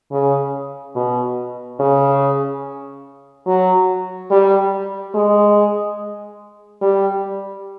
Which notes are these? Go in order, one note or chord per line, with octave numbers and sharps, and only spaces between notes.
C#3
B2
C#3
F#3
G3
G#3
G3